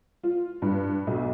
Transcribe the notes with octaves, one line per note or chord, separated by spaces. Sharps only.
F4
G2
B1